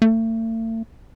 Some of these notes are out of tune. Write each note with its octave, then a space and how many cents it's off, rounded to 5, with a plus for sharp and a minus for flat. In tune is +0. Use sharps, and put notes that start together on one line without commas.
A3 +40